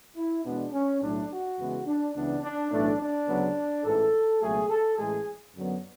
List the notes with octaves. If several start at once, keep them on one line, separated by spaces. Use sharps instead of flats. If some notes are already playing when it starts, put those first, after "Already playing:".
E4
E2 B2 G#3 B3 D4
C#4
B1 A2 F#3 A3 D4
F#4
E2 C#3 E3 G#3 B3
D4
C#2 C#3 E3 B3 D4
D4
B1 A2 E3 A3 D4
D4
D2 C#3 F#3 B3
A1 G#2 E3 A4
C#2 B2 F#3 A3 G#4
A4
A1 A2 E3 G#3 G#4
F#2 D3 F#3 B3